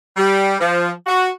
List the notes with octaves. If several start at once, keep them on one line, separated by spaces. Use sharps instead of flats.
G3
F3
F#4